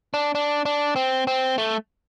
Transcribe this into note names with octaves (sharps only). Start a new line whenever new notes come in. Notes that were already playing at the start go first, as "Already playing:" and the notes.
D4
D4
D4
C4
C4
A3